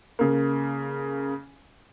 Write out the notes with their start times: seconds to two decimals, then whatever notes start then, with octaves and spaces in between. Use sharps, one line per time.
0.19 C#3 A#3